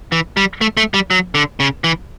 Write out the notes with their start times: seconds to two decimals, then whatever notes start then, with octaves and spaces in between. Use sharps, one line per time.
0.12 E3
0.37 G3
0.61 A3
0.77 A3
0.94 G3
1.11 F#3
1.35 D3
1.60 C#3
1.84 E3